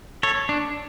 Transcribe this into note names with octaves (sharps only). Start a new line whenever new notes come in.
A4 C#5
D4